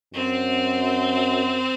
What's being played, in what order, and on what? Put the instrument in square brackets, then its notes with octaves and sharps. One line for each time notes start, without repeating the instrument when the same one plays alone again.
[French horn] F#2 [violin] C4